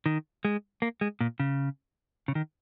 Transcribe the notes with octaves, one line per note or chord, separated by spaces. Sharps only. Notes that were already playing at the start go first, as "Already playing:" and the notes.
D#3
G#3
A#3
G#3
A#2
C#3
C#3
D#3